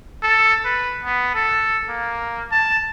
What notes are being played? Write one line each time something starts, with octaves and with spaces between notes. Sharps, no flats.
A4
B4
B3
A4
A#3
A5